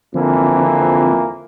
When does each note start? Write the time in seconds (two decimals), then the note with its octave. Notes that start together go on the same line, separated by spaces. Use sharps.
0.14 F2 D3 E3 F3 A#3 C4